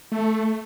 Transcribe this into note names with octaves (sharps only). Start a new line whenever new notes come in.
A3